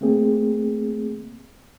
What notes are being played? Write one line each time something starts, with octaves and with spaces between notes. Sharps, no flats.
A3 A#3 C4 G#4